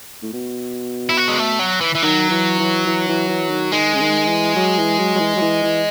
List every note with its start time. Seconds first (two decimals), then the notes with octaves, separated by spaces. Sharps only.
0.23 A2
0.33 B2
1.09 E4
1.17 F#4
1.28 G#3
1.38 A3
1.59 F#3
1.81 E3
1.95 E3
2.03 D#3 F#3
2.30 E3
2.59 E3
2.87 E3
3.09 E3
3.29 E3
3.50 D#3
3.72 D#3 G#3
3.94 C#3
4.00 D#3
4.28 E3
4.56 F#3
4.78 E3
4.99 F#3
5.15 F#3
5.20 E3
5.36 F#3
5.41 E3
5.63 E3